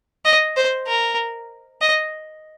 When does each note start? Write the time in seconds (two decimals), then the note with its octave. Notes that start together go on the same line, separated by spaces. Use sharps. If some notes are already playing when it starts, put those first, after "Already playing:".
0.25 D#5
0.56 C5
0.87 A#4
1.81 D#5